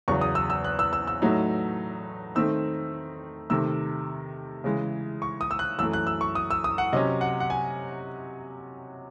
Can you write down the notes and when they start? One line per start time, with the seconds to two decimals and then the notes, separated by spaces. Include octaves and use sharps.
0.08 E2 C#3 F#3 C#6
0.21 D#6
0.35 E6
0.50 E6
0.64 F#6
0.79 E6
0.93 E6
1.07 E6
1.22 A2 F#3 A3 D#4
2.35 D#3 A3 C4 D#4 E6
3.50 C3 D#3 A3 E6
4.64 C#3 E3 G#3
5.22 C#6
5.41 D#6
5.51 E6
5.59 F#6
5.78 F#2 E3 A3 E6
5.93 F#6
6.07 E6
6.21 C#6
6.35 D#6
6.51 E6
6.64 D#6
6.78 F#5
6.92 C3 F#3 C#4 D#5
7.21 F#5
7.40 F#5
7.50 G#5